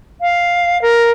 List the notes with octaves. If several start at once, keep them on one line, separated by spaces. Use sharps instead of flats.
F5
A#4